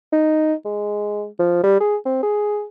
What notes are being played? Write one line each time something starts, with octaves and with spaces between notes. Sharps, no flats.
D#4
G#3
F3
G3
G#4
C4
G#4